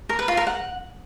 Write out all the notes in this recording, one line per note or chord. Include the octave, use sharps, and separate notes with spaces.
A#4
B4
F4
A#4
F#5